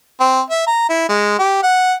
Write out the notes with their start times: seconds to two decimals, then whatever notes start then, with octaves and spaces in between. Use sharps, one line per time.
0.20 C4
0.50 E5
0.67 A#5
0.90 E4
1.09 G#3
1.39 G4
1.63 F#5